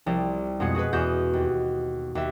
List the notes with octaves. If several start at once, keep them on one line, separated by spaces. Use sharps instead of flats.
C2 F3 G3 C4 D5
F2 B2 G#3 B3 G#4 C#7
F#4 G#4 A4 B4
E2 B3 F#4 G6 E7
D#2
D#2 E5